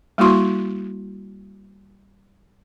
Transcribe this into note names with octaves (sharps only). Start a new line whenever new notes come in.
G3 A#3 E4 F#4 C6 C#6